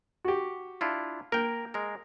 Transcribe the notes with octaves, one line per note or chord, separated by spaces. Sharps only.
F#4 G4
D4 E4 F4
A#3 A#4 G5
G#3 A#4